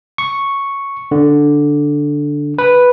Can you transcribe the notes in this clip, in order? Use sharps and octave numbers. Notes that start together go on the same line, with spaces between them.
C#6
D3
B4